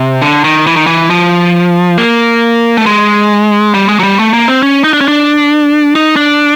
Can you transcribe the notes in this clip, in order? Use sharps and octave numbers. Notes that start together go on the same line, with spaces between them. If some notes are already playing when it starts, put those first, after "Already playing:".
Already playing: C3
D3
D#3
E3
D#3
E3
F3
A#3
A3
G#3
G3
G#3
F#3
G3
A3
A#3
C4
C#4
D#4
D4
C#4
D4
D#4
D4